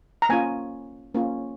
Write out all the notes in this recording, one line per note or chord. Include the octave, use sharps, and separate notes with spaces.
A#5
A#3 C#4 F4 G#5
A#3 C#4 F4